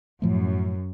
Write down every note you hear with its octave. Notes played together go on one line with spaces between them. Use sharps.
F#2 A2 F3 A3